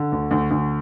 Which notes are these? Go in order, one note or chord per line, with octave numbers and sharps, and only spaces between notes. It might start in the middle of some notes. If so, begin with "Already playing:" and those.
Already playing: D3
D2
D2
D2